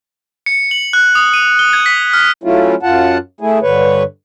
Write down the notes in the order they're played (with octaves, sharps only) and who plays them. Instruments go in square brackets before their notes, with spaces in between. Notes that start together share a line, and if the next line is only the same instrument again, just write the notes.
[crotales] C#7
F#7
F#6
D#6
D#7
G7
G#6
B6
F6
[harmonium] F#3 A3 C#4 E4 F4
F#2 F4 F#5 A5
A3 E4 G#4
G2 D3 B4 C#5